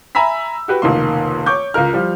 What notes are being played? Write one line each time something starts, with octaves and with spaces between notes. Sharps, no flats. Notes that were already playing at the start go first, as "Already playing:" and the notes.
E5 G#5 A#5 B5 E6 B6
F#4 G4 B4
F1 C#2 D#3 A#3 C6
C#5 C#6 D6 G6
C#2 F4 A#4 F6
F3 G3